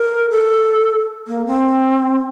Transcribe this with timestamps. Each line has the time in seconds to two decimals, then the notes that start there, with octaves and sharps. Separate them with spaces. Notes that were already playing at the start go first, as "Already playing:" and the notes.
Already playing: A#4
0.30 A4
1.28 A#3
1.47 C4